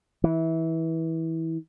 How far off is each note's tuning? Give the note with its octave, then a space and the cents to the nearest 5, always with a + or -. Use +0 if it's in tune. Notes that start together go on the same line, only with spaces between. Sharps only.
E3 -20